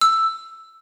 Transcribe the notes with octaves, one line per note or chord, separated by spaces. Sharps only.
E6